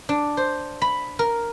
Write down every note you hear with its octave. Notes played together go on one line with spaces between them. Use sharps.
D4
C5
B5
A#4